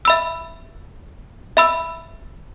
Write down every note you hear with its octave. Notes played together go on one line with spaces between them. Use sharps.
E5 B5 E6
E5 B5 E6